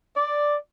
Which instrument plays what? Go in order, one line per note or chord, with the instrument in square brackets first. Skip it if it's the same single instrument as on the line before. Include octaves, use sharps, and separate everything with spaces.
[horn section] D5